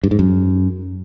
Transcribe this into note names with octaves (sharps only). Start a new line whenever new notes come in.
G2
G#2
F#2